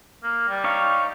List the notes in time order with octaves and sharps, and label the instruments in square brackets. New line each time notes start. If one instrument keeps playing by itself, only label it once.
[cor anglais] A#3
G3
[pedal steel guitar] D#4 C#5 F5